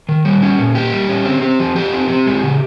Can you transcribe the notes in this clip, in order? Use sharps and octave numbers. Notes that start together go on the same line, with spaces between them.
D#3
G3
C#4
A#2
A#3 G4
G3
C#4
C4
C4
F3
F3 G4
C4
C4
G#3
C#3